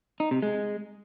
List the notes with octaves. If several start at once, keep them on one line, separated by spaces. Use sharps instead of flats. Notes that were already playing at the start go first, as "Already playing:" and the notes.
D#4
C3
G#3